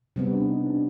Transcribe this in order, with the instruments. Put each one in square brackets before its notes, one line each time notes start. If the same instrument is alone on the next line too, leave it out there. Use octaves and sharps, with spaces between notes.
[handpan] C3 G3 B3 [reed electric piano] C4
[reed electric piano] D4
D#4
D4